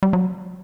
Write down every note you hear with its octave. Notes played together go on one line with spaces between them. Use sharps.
G3
F#3